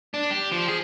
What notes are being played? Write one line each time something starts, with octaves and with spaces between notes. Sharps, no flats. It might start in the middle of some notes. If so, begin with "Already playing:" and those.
D4
G4
F3
G#4